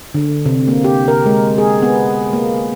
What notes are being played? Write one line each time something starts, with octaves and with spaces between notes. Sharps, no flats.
D3
C3
A#3
G4
A#4
G#3
G#4
B3
A#3